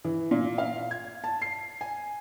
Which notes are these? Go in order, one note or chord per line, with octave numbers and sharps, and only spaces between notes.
E3
A#2
F5
G#6
A5
C7
G#5